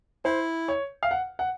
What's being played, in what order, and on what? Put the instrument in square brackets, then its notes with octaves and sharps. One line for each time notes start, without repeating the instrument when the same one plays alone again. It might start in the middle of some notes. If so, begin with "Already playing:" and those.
[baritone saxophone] E4 [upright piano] C5
[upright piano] C#5
F5
F#5
F#5